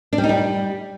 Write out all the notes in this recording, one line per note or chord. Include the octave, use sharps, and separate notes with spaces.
D4
G3
D#4
G3